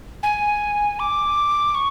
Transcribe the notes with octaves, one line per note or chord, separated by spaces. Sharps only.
G#5
D6
C#6